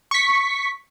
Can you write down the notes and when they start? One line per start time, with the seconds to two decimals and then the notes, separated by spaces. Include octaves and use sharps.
0.11 C#6 B6